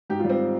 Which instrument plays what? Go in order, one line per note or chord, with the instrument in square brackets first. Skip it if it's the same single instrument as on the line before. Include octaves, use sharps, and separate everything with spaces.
[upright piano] G#2 G4
F4
G3
C4